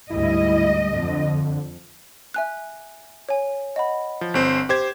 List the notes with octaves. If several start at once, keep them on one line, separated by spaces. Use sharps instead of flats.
D2 G#2 G3 E4 D#5
F2 D3 F3
E5 G#5 F#6
C#5 G#5
D#5 F#5 B5
F3
G1 C4 C5
G4 C5 G#6